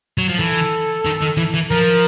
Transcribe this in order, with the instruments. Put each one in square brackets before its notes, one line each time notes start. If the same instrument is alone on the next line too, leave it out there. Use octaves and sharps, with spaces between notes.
[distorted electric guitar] F#3
F3
[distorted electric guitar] E3 [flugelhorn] A4
[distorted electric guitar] D#3
D#3
E3
E3
[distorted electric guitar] F3 [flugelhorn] A#4